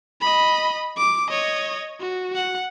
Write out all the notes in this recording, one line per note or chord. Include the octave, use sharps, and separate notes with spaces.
D#5 B5
D6
C#5 D#5
F#4
F#5